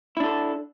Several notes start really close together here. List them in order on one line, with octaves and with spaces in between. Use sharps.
E4 D4 A4